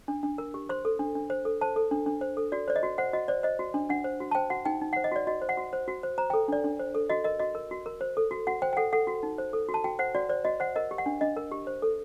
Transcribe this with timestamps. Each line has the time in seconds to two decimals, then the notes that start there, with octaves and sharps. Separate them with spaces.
0.08 D4
0.23 D4
0.38 A#4
0.54 G4
0.69 C5 C6
0.85 A4
0.99 D4
1.15 D4
1.30 C5
1.45 A4
1.61 C5 A5
1.76 A4
1.91 D4
2.06 D4
2.21 C5
2.37 A4
2.52 F#4 D5
2.68 C5 D5
2.76 D#5
2.83 F#4
2.98 C5 F#5
3.13 F#4 D#5
3.28 C5 D5
3.43 C5 D#5
3.59 F#4
3.74 D4
3.89 D4 F#5
4.04 C5
4.20 F#4
4.31 A5
4.35 C5 G5
4.50 F#4 F#5
4.65 D#4 G5
4.81 D#4
4.93 F#5
4.96 C5
5.04 D#5
5.12 F#4 D5
5.27 F#4 D#5
5.42 C5
5.49 F#5
5.57 F#4
5.73 C5
5.88 F#4
6.03 C5
6.18 C5 A#5
6.30 G5
6.33 A4
6.48 D4 D5
6.64 D4
6.79 C5
6.95 A4
7.10 F#4 D#5
7.24 A#4 D#5
7.39 F#4 D#5
7.55 A#4
7.71 F#4
7.86 A#4
8.01 C5
8.17 A4
8.31 F#4
8.47 F#4 F#5
8.62 C5 G5
8.73 G5
8.77 A4 F#5
8.93 A4 F#5
9.07 F#4
9.23 D#4
9.38 C5
9.53 A4
9.69 F#4
9.74 A5
9.84 F#4 G5
9.99 C5 F#5
10.15 F#4 D5
10.29 C5 D5
10.45 F#4 D#5
10.60 C5 F#5
10.76 A#4 D#5
10.91 G4
10.98 F#5
11.06 D4
11.21 D4 D#5
11.37 A#4
11.51 G4
11.67 C5
11.82 A4